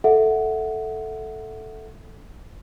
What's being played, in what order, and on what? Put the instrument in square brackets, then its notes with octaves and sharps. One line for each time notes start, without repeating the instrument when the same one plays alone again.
[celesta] A4 E5 F#5